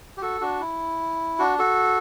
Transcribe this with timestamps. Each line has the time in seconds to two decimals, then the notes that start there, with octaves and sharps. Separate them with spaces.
0.17 G4
0.22 F#4 A4
0.41 D4 F#4
0.61 E4
1.39 D4 F#4
1.59 F#4 A4